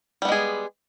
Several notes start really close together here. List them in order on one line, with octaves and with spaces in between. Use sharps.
G3 B3 G#3 G#4